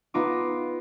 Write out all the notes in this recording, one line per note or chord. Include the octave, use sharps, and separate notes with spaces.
B3 D#4 F4 D6